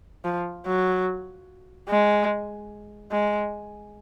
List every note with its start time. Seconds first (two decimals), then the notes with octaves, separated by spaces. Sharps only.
0.25 F3
0.66 F#3
1.89 G#3
3.11 G#3